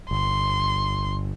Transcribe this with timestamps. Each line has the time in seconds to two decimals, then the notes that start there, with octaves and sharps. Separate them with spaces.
0.11 G1 C6